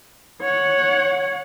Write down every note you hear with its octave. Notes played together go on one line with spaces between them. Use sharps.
C#5 F#5